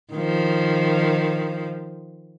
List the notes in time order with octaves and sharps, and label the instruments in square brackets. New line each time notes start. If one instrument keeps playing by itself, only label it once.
[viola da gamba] D#3 F3